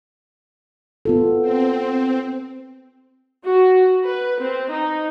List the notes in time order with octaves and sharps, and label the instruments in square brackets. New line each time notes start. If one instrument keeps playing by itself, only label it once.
[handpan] B3 F4 A4
[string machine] C4
[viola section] F#4
B4
C4
D#4